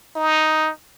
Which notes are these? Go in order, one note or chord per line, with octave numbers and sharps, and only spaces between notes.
D#4